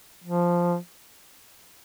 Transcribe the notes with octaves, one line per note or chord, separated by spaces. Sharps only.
F3